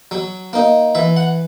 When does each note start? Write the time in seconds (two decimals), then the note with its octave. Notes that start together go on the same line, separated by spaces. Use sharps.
0.11 F#3
0.53 A#3 D#4
0.95 E3 E5
1.17 F#5